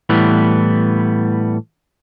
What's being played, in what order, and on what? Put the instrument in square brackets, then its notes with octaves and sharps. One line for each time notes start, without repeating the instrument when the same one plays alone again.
[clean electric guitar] A2 E3 G3 B3